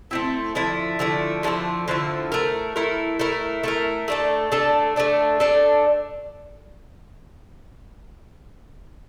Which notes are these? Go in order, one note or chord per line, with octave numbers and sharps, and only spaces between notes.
A3 C4 E4
D3 F3 A3 E4
D3 F3 A3 E4
D3 F3 A3 E4
D3 F3 A3 E4
A3 E4 A#4
A3 E4 A#4
A3 E4 A#4
A3 E4 A#4
A3 D4 A4
A3 D4 A4
A3 D4 A4
A3 D4 A4